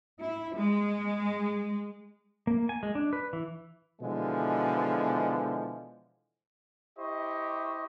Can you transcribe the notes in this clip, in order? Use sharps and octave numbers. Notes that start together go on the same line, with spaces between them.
E4
G#3
A#3
G#5
G#3
D4
B4
E3
B2 D3 E3 F3 G#3
E4 G4 C5 D#5 C#6